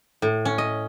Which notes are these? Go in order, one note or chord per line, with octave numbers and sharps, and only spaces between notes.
A2
C#4
D#5